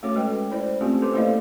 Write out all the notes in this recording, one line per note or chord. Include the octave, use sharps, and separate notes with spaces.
A3 C#4 F#4 A4 C#5 D6
G#3 B4 G5
E4 C5 D5
A3 C4 C#4 F4 G4 A4
A4 B4 C5 C6 D6
A3 A#3 E4 D5 D#5 F5